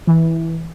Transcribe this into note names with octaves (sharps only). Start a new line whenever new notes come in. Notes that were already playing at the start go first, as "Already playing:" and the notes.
E3